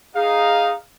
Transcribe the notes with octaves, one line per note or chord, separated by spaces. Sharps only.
D#4 G#4 F5